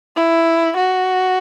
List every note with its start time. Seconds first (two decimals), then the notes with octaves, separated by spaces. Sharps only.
0.16 E4
0.77 F#4